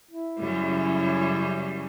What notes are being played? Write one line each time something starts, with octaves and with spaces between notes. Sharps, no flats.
E4
F#2 C#3 G3